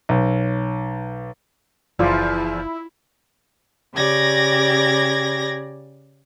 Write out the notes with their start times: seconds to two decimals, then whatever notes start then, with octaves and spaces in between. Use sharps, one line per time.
0.09 B1
1.99 F#1 E2 F3 E4 F4 D5
3.94 C#3 G4 D5 G#6 A#6